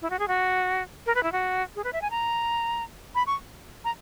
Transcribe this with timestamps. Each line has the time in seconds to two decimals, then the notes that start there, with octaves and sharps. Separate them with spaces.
0.02 E4
0.10 F#4
0.19 G#4
0.28 F#4
1.06 A#4
1.15 B4
1.23 E4
1.32 F#4
1.76 G#4
1.84 B4
1.93 E5
2.02 G#5
2.11 A#5
3.15 B5
3.27 C#6
3.84 A#5